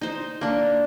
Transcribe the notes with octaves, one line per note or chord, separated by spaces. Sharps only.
D#4 C5
A#3 D4